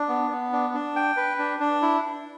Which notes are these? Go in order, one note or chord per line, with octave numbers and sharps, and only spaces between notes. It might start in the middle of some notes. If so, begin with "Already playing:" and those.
Already playing: D4
B3
B3
D4
D4
G5
B4
D4
D4
E4